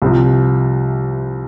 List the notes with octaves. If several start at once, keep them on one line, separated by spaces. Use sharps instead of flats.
C2 C3 F3